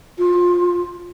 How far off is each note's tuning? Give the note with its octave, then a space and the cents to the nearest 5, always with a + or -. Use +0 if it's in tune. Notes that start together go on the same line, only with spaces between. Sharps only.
F4 +20